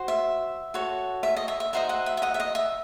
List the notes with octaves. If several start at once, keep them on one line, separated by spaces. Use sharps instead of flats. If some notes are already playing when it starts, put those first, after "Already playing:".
Already playing: F#4 C5
E5
F#4 A4 C#5
E5
D#5
E5
E5
D#4 F#4 C5 D#5 E5
D#5 F#5
E5
E5
D#5 F#5
E5
D#5
E5